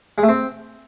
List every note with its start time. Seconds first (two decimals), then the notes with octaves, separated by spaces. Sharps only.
0.18 G#3
0.23 A3
0.28 C4